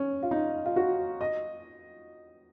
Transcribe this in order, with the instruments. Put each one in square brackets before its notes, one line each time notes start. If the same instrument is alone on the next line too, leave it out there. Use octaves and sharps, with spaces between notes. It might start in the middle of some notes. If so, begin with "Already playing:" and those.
Already playing: [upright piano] C#4
F4
D#4
F4
F#4
D#5